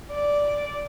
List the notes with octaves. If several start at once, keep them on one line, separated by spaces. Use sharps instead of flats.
D5